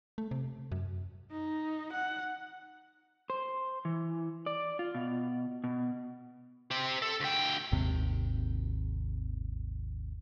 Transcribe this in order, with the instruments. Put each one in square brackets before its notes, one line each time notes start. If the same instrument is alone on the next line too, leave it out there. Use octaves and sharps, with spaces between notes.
[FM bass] A3
C3
F#2
[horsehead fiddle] D#4
F#5
[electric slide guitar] C5
E3
D5
F4
B2
B2
[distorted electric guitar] C4 G4
A4
D2 G5
[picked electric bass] G#1 D#2 C3